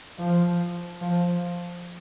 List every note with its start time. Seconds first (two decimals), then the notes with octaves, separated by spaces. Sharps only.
0.19 F3
1.01 F3